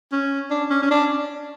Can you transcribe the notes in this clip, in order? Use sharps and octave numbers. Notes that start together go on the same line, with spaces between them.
C#4
D4
C#4
C#4
D4